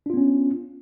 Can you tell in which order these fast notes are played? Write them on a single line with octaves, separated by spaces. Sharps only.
D4 F4 B3 C#4